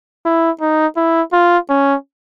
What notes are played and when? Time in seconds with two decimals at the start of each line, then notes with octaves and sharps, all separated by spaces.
0.25 E4
0.61 D#4
0.96 E4
1.32 F4
1.69 C#4